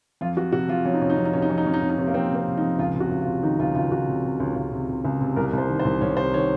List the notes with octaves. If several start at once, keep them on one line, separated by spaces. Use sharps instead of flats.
F2 F4
F2 F#4
C3 F#4
F2 F4
F2 C#4
D#4
C3 C#4
D#4
F2 C#4
D#4
C3 C#4
D#4
F2 C#4
D#4
F2 C#4
D#4
C3 C#4
D#4
C3 C#4
A#3
F2 C4
C3 C4
C3
D#4
F2
C#2 F4
C3
F#4
C#2
F4
C3
D#3 D#4
C#2 F4
C#2 F4
C#2 F#4
C3
C3
C#2
C#2
C3
C3
C#2
C3
C2 A#4
C2
C5
D#3
C5
C2
C2 C#5
C3 C5
D#3 C#5